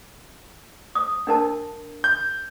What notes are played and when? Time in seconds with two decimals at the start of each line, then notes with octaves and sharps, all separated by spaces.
0.95 D#6
1.27 D4 A#4 A5
2.04 G6